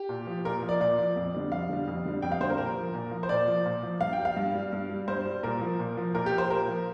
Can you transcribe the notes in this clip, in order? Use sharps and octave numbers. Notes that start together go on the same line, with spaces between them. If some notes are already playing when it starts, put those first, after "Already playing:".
Already playing: G4
A#2
F3
A#2 A#4
F3
D5
A#2 D5
F3
F2
D3 G3
F2 F5
D3 G3
F2
D3 G3
F2 G5
F5
D3 G3 A#4 C5
A#2 A#4
F3
A#2
F3
C5
A#2 D5
F3
A#2
F3
G2 F5
G5
G3
F5
G2
G3
G2
G3
G2 C5
G3
A#2 A#4
F3
A#2
F3
A#2 A#4
G4
F3
C5
A#2 A#4
F3